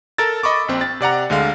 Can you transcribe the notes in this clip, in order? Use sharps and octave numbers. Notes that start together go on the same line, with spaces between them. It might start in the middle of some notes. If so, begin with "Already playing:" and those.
A4 A#4 E6 A6
D#5 B5 C#6 D6
A#1 C4
A6
C3 D5 F#5 A#5
D2 D3 G#3 F5